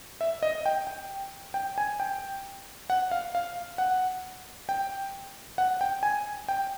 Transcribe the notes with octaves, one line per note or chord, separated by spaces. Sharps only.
E5
D#5
G5
G5
G5
G#5
G5
F#5
F5
F5
F#5
G5
F#5
G5
G#5
G5